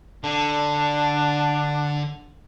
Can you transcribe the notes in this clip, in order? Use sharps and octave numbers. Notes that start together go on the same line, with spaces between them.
D3 D4